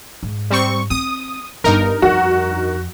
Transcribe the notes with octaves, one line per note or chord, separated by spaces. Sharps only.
G#2
G3 C4 C#6
C4 D#6
G1 G2 D#4 A#4
F2 F#4